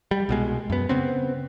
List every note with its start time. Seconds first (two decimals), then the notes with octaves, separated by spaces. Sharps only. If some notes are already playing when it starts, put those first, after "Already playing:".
0.11 G3
0.29 C2 B2 G#3
0.70 F#2 B3
0.89 C#3 B3 C4